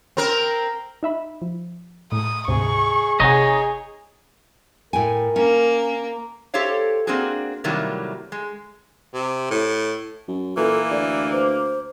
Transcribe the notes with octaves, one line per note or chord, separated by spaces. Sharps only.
C4 A#4
D#4 E5 B5
F3
A2 D#6
D2 G#2 C3 G#4 C#6
G1 C3 D#4 G#4 C#5 D#5 F#5
A2 A#4 G5 G#5
A#3 C#4
G4 A4 C5 C#5 F5
A#3 C4 D4 F#4 G#4
A2 C3 D#3 F#3 G3 A#3
G#3
C3
A2
F#2
A#2 E3 A#3 A4
D2 D5
C5